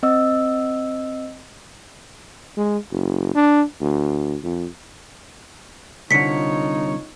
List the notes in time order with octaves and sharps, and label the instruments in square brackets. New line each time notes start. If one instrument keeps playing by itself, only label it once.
[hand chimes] C4 D#5 E6
[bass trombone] G#3
F#1
D4
D2
F2
[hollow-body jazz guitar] C2 D3 [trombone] D#4 [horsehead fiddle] F4 C#5 [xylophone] B6 C#7